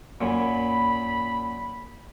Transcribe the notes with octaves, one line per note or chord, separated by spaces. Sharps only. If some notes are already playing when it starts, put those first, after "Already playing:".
F#2 A#2 B5